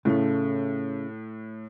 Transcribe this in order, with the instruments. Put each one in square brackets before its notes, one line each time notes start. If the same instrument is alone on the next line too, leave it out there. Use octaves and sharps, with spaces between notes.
[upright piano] A2 [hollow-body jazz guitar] C#3 A3